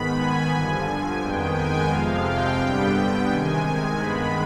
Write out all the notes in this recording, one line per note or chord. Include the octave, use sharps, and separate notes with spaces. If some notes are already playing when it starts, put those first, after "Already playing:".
Already playing: G#2 D#3 B3 B5
G#5
G2 D3 F3
F2 D#3 G#3 B3 G5
G#5
F2 C3 F3 G#3 F5
G5
G2 D3 G3 B3 G5
C3 D#3 G#3 G#5
G2 D#3 G#3 B3 B5